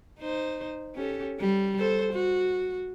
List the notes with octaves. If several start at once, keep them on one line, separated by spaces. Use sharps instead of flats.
D#4 C5
C#4 G4 A4
G3
A4 C5
F#4